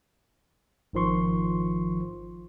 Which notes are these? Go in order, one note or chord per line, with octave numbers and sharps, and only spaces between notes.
G#1 D#3 F3 C6 C#6